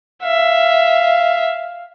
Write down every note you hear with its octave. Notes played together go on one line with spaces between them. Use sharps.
E5 F5